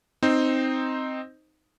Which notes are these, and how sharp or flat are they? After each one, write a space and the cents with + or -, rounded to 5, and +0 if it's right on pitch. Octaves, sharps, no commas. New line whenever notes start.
C4 +0 D#4 +0 C5 +0